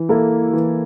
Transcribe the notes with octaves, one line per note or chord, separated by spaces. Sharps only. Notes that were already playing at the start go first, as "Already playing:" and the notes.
Already playing: E3
A#3 E4 A4
E3